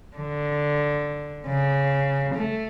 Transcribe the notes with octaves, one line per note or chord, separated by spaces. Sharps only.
D3
C#3
A3